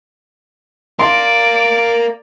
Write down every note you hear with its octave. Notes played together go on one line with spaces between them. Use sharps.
A#4 D5 F5 C6 D7